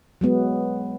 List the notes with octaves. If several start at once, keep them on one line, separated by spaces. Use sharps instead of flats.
F#3 G#3 B3